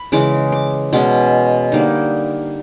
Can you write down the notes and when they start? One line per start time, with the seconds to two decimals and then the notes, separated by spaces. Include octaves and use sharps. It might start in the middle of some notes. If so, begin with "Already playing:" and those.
Already playing: B5
0.12 C#3 E3 G#3 D6
0.52 D6
0.93 B2 G#3 C#4 D6
1.72 D3 G3 A#3 D#4